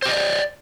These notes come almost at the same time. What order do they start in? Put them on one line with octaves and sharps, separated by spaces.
C5 G4 D#5 D5